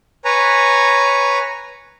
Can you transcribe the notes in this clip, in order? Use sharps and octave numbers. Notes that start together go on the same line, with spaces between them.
B4 C#5 G#5 A#5